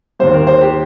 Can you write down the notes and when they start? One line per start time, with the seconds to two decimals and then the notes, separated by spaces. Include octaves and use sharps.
0.19 D#2 D#3 G3 C5
0.34 A#4
0.47 C5
0.61 G4